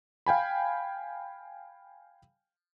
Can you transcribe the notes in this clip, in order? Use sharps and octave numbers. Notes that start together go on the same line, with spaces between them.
F5 G5 G#5 B5